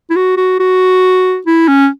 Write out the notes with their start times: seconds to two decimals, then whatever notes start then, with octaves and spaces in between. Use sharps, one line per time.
0.10 E4
0.16 F#4
0.37 F#4
0.60 F#4
1.46 E4
1.68 C#4